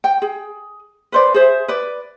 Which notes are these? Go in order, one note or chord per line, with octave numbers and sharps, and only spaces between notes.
G5
G#4
B4 C5 D5
G#4 C5 E5
B4 D5